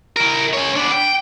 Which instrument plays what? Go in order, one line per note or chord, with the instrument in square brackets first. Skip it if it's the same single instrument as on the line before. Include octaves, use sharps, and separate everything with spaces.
[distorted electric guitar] E4 A#4
G#3 C#5
B3 D4
G5